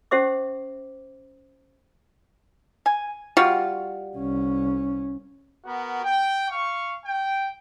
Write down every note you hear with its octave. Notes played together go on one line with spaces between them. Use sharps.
C#4 G4 C5 E5 D6
G#5
G3 F4 F#4
C2 C#4
B3 F#4 A#4
G5
F5 C#6
G5